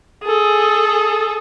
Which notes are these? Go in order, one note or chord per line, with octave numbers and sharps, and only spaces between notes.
G#4 A4